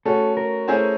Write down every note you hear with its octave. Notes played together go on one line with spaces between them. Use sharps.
A3 C#4 F#4 A4
A#4
A3 C#4 E4 G#4 C5